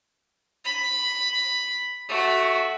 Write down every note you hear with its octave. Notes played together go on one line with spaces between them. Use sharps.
B5
A3 F#4